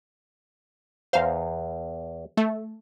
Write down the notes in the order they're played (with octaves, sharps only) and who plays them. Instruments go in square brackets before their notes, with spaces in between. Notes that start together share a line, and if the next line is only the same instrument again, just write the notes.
[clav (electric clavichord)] E2 A#5 [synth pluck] C5 F5
[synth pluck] A3